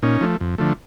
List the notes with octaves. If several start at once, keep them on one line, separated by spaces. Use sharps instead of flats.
A#2 C#4 D#4
F3 A3
F2
D3 F3 A3